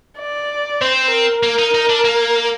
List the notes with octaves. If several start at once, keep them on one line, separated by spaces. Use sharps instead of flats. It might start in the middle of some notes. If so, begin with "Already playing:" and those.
D5
C4 C5
A#4
A#3
D#4
D#4
D4
A#3